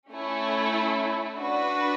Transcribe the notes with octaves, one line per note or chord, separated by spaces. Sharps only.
A3 C#4 E4
D4 F#4 B4